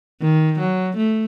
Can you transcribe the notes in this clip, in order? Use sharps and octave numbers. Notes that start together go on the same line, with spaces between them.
D#3
F#3
A3